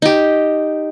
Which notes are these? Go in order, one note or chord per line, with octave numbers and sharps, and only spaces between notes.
D#4 G4